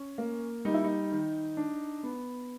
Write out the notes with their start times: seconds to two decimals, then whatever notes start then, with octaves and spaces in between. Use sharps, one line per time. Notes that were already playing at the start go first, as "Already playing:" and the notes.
Already playing: C#4
0.18 A#3
0.65 G3 D#4
0.74 E4
0.84 D#4
1.12 D#3
1.57 D4
2.03 B3